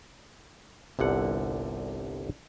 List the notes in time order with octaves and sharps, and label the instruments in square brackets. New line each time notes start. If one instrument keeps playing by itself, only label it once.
[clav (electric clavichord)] G1 C2 D3 F#5